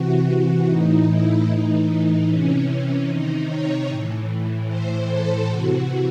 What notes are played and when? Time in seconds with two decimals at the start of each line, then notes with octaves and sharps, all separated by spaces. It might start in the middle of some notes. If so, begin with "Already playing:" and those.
Already playing: C3 E3 F#4
0.67 A2 E3 D#4
1.07 E4
1.47 A2 E3 D#4
2.28 C3 E3 C#4
2.68 C#4
3.08 C3 D#3 D#4
3.48 C#5
3.88 A2 E3
4.68 A2 E3 C5
5.08 A4
5.48 C3 E3 F#4